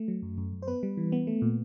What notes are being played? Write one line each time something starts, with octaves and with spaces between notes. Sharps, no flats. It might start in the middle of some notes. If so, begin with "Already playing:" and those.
Already playing: A3
F#3
F#2
F#2
F#2
C5
B3 B4
G3
E3
B3
A3
A#2